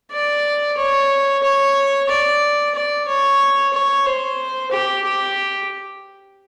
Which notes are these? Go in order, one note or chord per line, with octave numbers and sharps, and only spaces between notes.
D5
C#5
C#5
D5
D5
C#5
C#5
C5
G4
G4